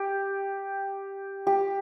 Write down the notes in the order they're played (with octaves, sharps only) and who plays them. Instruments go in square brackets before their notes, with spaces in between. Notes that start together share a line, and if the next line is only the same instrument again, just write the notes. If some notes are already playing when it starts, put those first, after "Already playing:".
Already playing: [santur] G4
G4